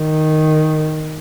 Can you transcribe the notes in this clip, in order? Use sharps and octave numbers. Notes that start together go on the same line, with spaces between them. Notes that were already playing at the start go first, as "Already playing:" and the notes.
Already playing: D#3